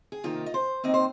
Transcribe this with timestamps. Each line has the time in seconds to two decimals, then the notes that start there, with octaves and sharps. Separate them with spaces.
0.12 G#4
0.24 C3 D#3 A#3 D#4 F4
0.46 D#5
0.54 C5
0.84 D#2 D#3 C4 D#4 D#5
0.94 C5